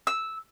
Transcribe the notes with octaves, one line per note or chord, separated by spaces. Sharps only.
E6